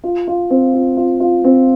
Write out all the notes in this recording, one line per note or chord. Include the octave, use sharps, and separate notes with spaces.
F4
F4
C4
F4
F4
F4
C4